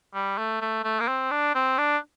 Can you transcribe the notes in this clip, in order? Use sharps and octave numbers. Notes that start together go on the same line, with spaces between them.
G3
A3
A3
A3
A#3
C4
D4
C4
D4